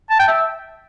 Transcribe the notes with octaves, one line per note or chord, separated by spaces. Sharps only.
A5
G5
E5